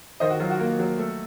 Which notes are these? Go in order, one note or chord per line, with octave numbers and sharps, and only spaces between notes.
D#3 C5 D#5
F#4
F#3 F4
F#4
A#3
F#3
A3